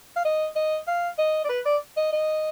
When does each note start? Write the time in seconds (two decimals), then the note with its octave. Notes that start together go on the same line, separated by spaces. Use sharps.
0.16 F5
0.25 D#5
0.56 D#5
0.87 F5
1.18 D#5
1.44 D5
1.49 B4
1.66 D5
1.97 D#5
2.13 D#5